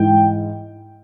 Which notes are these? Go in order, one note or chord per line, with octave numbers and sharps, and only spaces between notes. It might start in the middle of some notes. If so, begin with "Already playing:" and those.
Already playing: G#2 E3 G5